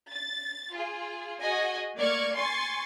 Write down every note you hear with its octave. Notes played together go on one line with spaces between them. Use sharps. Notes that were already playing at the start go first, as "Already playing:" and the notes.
A6
F4 G#4
F#4 G#4 D#5 G#5
A3 A#3 D5 C#6 F6 G#6
G#5 C6 C#6 A6